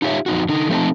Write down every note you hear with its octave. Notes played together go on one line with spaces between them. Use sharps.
D#4 F4 G4 C#5 E5
F2 D#4 F#4
D3 D#4
F3 A3 C4 D#4 A4